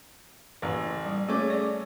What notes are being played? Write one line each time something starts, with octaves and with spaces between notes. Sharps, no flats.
A1
G3
A3 C#4 G#4 D6
D5